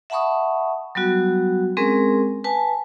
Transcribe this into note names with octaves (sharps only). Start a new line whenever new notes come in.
E5 F#5 A5 B5 C#6 D#6
F#3 G3 B3 F#4
G#3 C4 C#4 G#4 A#4
B4 G#5 A5